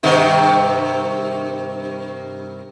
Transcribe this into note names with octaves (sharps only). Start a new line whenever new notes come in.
G2 C3 D#3